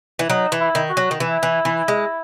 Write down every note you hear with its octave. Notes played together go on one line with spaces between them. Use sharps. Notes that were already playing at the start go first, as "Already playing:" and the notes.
E3
F#3 D#4
E3
E4
D#3
F#4
F#3
D#3
E3 E4
E3
E3
G#3